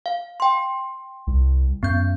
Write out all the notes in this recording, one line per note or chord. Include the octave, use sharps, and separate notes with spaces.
F5
G5 C6
C2
F#2 B3 G6